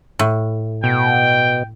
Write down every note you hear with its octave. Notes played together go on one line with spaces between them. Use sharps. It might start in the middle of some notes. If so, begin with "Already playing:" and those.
A2
B2 G5